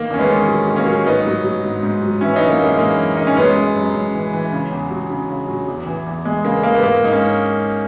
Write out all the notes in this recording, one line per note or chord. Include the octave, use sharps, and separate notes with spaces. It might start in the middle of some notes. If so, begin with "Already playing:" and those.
Already playing: D#3 A#3
E2 C#4
G#3 B3
D#3
F#3
D#3
A#3 C#4
F#3
G#2 B3 D#4
F#3
F#3
G#2
G#2
F#3
E3 C#4 E4
B3 D#4
F#2
A#3
F#2 G#3
E3 A#3
F#2
E3 D#4
C#4
F#2 G#3 B3
F#2
F#2
F#2
E3
E3
C#3
E2
F#3
C#3
C#3
F#3
E2
E3
E2
E2 G#3
C#3 A#3
E2 A#3
B3
G#2 A#3
G#2 D#4
A#3 C#4